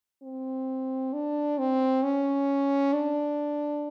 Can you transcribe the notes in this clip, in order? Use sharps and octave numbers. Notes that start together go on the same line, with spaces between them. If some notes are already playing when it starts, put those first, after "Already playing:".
C4
D4
C4
C#4
D4